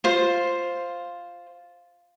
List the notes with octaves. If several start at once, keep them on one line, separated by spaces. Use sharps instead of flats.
F4 C5